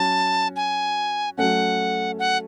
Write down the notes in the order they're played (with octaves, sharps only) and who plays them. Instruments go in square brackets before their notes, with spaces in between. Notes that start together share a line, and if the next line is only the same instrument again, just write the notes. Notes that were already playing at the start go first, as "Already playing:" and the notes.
Already playing: [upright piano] F#3 C#4 F#4 [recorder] A5
[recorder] G#5
[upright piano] F#3 A3 C#4 [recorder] F#5
[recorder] F#5